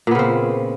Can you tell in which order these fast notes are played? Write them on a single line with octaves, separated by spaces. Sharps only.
A#2 B3 C#3 C4